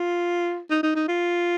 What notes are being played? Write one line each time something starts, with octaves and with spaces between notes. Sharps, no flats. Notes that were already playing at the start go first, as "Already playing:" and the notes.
Already playing: F4
D#4
D#4
D#4
F4